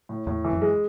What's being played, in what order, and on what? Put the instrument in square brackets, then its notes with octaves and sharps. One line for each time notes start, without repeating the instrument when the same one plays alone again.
[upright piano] A2
[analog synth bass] E2 [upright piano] A2
[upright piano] E3
[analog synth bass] F#2
[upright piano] G#3